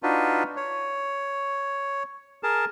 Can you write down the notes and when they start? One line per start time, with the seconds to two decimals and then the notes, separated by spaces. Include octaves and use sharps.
0.03 D4 D#4 F4 F#4 B4
0.56 C#5
2.43 G#4 A#4 A5